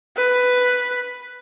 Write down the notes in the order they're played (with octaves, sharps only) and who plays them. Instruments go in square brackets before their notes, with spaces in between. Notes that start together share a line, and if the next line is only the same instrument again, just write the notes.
[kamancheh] B4